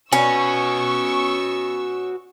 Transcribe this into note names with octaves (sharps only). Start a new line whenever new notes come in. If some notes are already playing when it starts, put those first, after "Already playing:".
C#4 F#4 B4 C#6 E6